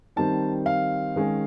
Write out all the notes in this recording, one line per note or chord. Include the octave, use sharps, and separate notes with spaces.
D#3 G3 C4 D#4 A5
F5
D#3 G#3 C#4